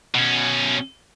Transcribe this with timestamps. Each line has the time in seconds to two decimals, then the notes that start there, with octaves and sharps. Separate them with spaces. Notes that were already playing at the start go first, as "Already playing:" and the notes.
0.15 B2 C#4